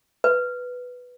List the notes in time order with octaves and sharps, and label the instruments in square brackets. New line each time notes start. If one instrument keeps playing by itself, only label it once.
[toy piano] B4